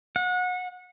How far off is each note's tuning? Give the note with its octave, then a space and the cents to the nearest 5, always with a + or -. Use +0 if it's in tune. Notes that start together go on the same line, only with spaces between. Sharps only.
F#5 -30